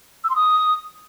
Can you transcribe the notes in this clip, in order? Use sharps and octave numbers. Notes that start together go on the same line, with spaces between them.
E6
C6
D#6